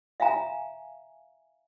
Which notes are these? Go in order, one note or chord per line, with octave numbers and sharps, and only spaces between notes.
E5 F5 G#5 A#5